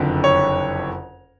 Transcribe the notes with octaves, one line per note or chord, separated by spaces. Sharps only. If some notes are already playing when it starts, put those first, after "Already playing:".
Already playing: F#1 F2 D3
C#5